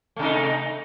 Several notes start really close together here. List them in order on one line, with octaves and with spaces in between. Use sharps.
A3 C3 D#4